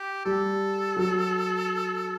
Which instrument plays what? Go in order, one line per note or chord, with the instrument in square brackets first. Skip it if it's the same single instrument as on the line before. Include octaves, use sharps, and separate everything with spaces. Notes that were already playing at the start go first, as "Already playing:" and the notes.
Already playing: [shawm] G4
[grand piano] G3 [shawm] A4
[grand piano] F#3